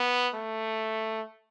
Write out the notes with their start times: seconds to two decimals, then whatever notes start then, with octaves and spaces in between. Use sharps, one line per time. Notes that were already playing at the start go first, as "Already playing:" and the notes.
Already playing: B3
0.34 A3